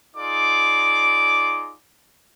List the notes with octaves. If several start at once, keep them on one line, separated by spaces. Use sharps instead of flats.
D#4 F4 G#4 D5 D6